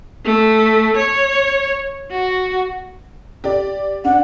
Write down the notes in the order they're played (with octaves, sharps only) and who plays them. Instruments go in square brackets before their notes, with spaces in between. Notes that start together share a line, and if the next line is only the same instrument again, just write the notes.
[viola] A3
C#5
F#4
[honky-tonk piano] G4 D5
[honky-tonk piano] D4 [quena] F#5